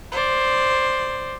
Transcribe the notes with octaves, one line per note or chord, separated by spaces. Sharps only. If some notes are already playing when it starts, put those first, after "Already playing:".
C5 D5